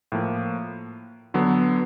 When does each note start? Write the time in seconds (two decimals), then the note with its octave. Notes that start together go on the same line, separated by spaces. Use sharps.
0.12 A2 F3 A#3
1.34 D3 F#3 B3